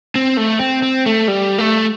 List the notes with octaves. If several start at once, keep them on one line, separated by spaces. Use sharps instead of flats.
C4
A3
C4
C4
A3
G3
A3